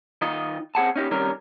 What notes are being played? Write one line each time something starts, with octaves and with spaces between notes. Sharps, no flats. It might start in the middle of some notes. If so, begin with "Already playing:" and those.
D#3 D#4 F4 D#5
C4 G#4 F#5 A5
C#4 D#4 G4
C3 D#3 G3 C#4 A#4